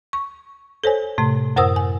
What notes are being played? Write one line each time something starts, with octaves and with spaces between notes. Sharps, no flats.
C#6
A4 C5 C#5 G#5
A2 C3 A3
F#2 A#4 C5 F#5 D#6 E6
G#5